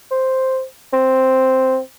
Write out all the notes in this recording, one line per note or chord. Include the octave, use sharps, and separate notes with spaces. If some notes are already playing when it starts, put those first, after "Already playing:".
C5
C4